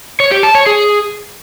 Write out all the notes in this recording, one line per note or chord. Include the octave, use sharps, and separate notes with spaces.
C#5
G4
A5
C#5
G#4